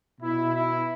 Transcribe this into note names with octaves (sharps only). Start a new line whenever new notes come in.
B2 E4
E4